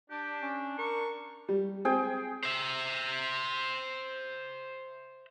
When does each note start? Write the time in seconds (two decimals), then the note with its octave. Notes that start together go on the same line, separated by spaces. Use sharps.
0.10 D4 G4
0.42 C#4
0.79 A#4 C#6
1.49 G3
1.85 C4 G#4 G5
2.43 C5 E5